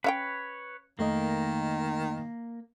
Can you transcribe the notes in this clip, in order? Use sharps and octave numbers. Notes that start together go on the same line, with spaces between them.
C#4 B4 C#5 E5 G5
F2 D#3 A3 A#3 D#5